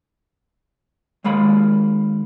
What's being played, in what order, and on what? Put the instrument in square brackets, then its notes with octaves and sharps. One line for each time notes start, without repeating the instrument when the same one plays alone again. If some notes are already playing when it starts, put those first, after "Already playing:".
[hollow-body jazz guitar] D#2 G#3 A#3 B5